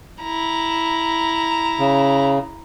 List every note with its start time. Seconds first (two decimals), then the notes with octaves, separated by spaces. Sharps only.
0.22 E4 A#5
1.79 C#3